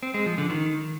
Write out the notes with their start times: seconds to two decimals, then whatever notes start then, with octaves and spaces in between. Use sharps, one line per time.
0.03 C4
0.14 G#3
0.26 F3
0.38 D3
0.50 D#3